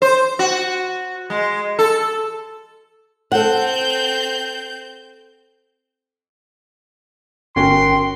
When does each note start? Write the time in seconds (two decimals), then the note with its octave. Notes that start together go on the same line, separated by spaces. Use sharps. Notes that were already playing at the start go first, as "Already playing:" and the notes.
0.02 C5
0.39 F#4
1.30 G#3
1.79 A4
3.32 C4 A4 F#5 G6
7.56 G1 C#4 F#4 A#4 G5 C6